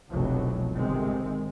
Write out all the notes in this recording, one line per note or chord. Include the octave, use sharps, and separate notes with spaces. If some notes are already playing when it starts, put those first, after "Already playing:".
F1 C2 B2 F#3
G1 C3 D#3 G#3 C4